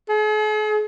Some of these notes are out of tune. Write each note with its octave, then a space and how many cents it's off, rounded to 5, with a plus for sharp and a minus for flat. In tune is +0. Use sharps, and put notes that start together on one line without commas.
G#4 +45